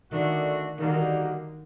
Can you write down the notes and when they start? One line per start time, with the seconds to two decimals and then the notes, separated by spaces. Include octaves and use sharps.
0.12 D3 D#3 A3 D4 F#4
0.78 D3 D#3 G3 A#3 D#4 F#4